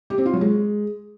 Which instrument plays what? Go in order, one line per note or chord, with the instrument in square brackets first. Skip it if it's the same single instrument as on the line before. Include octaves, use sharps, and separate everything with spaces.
[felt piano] G4
C4
F4
F#3
G#3